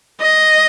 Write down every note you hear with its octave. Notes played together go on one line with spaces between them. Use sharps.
D#5